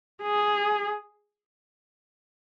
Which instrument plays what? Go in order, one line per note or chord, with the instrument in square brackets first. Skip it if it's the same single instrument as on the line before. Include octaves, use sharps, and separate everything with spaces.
[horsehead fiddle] G#4